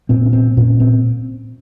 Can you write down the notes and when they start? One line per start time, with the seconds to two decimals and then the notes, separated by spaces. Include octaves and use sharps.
0.09 A#2 C4
0.26 C#4
0.33 C4
0.57 A#2 C#4
0.80 C4